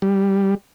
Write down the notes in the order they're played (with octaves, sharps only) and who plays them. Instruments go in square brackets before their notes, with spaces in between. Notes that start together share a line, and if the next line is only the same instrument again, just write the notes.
[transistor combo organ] G3